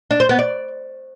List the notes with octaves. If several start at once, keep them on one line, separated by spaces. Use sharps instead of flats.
D4
C5
B3
D5